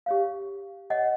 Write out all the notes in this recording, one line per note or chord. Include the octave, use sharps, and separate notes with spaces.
G4 C#5 F5
C#5 D#5 F#5